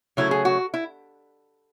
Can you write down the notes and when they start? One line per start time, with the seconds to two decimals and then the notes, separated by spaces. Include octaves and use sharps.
0.17 C#3 F#3 A3 E4
0.31 G#4
0.45 F#4
0.74 E4